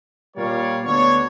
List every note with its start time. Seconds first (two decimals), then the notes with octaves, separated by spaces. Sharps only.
0.36 A#2 G3 A#4 C#5 D5 F5
0.84 D2 B3 D4 C#5